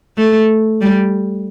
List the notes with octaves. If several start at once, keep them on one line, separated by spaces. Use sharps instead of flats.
A3
G3